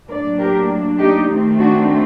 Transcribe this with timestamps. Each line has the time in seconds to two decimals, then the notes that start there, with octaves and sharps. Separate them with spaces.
0.09 A2 F#3 A#3 D4 A#4 D5
0.38 G4 A#4
0.99 D#4 G4
1.29 D#3 A3 C4 D#4
1.60 D4 F#4